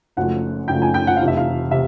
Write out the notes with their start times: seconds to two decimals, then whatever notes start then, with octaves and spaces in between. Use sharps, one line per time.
0.17 F#1 F#2 C#3 F3 A3 F#5
0.68 F#1 F#2 C#3 F3 A3 G5
0.82 G#5
0.94 G5
1.07 F#5
1.17 F1 E2 C3 F5
1.28 E5
1.37 F5
1.71 C3 E5